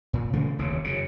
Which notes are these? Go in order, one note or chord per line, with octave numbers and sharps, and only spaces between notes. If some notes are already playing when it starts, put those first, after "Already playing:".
A#2
C#3 E3 A3 A#3
F1 D#2 C#3
F#2 C#3